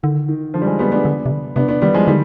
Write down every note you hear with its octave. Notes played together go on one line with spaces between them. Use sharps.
D3 D#3
D#3
D3 F3
G3
F3 G#3
G3 B3
B3 D4
D3
C3
D3
C3 B3 D4
B3 D4
D#3 G3 B3
F3 G#3
D3 D#3 G3